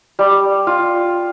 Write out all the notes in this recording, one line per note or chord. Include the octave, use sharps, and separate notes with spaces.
G3
F4